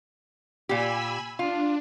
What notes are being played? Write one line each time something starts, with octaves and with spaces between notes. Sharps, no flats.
A#2 G4 G#5 B5 E6
D4 F4